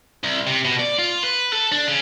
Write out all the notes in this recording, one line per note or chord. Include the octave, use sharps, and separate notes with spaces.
C2
C3
B2
D5
F4
B4
A4
D4
C#3